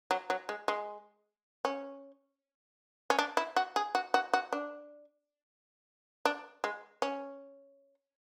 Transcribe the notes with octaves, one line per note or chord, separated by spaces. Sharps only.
F#3
F#3
G#3
G#3
C#4
C#4
D4
E4
F#4
G#4
F#4
F#4
F#4
D4
D4
G#3
C#4